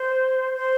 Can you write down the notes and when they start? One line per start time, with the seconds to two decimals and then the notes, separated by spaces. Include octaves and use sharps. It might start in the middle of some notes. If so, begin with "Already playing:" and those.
Already playing: C5
0.56 C5